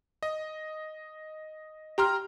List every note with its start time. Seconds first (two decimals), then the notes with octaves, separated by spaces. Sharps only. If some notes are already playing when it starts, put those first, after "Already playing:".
0.23 D#5
1.98 G4 G5 A#5 C6 F6